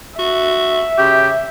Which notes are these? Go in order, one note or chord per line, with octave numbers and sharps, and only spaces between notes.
F#4 E5
C#3 G4